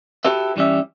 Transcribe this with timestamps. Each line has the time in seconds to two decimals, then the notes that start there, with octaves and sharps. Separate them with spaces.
0.25 E4 F#4 G4 A4 B4 E5
0.56 G2 E3 G3 C#4 E5